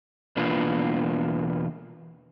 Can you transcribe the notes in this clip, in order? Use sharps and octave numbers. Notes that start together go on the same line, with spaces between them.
E2 B2 A#3 D4 F4 B4